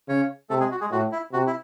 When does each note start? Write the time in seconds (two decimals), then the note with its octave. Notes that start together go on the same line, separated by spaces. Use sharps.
0.08 C#3 C#4 C#5
0.50 C3 A3 A4
0.60 G#3 G#4
0.71 F#4
0.81 G#3 G#4
0.91 A2 F#4
1.12 E4
1.33 C3 F#4
1.47 E4